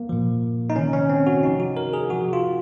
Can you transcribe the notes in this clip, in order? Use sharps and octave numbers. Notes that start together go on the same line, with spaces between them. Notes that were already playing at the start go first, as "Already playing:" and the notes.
Already playing: A#3
A#2 F3
D#4
C3 D#3 C#4
C#4
C4
F#4
C3 F3 D#4
F#4
A#4
G#4
C3 F3 F#4
F4